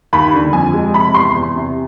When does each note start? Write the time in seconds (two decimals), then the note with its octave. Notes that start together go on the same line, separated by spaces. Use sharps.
0.13 D#2 B5
0.33 D3
0.53 F2 G#5
0.73 G#3
0.94 C3 B5
1.14 E2 C6
1.35 E2
1.56 C3